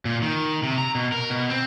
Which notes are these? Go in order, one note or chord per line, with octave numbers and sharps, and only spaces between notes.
A#2
D#3
C3
A#5
B2
A#4
B2
C4